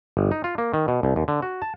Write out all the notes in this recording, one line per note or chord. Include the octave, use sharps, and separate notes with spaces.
G1
D#4
F4
A#3
D#3
B2
C2
D#2
D3
F#4
A5